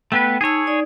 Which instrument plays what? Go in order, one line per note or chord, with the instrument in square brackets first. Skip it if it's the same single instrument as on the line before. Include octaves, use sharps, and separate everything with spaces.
[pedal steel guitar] A3 B3 B4 [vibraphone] G5
[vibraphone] D#4 A5 E6 [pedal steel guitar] G#4 C#5
[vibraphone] D#4 D5